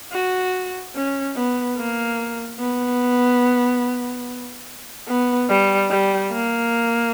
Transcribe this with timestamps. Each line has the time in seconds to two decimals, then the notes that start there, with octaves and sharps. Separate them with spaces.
0.12 F#4
0.95 C#4
1.36 B3
1.77 A#3
2.60 B3
5.08 B3
5.49 G3
5.90 G3
6.32 A#3